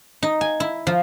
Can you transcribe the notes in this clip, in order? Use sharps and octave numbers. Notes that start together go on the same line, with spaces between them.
D#4
G#5
E4
F3